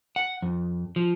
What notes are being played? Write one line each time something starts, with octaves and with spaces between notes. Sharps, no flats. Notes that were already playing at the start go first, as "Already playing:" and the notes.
F#5
F2
F3